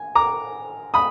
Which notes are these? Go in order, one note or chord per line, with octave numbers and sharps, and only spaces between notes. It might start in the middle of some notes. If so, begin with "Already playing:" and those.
Already playing: G#5
A#5 D6
B5 D#6